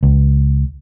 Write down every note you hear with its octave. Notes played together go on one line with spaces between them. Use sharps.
C#2